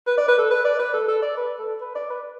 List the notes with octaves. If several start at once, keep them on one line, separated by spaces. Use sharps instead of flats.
B4
D5
B4
A4
B4
D5
B4
A4
A4
D5
B4
A4
B4
D5
B4